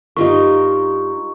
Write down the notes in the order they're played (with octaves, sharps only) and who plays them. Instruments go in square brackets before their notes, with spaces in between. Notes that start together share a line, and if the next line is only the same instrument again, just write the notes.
[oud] G2 G4 [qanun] D#4 F4 A#4 [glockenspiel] C#6